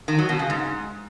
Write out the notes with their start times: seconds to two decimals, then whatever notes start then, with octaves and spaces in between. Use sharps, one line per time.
0.08 D#3
0.18 F#3
0.29 B2
0.39 C#3
0.50 G#2